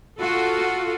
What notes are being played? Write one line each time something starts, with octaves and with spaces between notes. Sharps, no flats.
F4 F#4 A4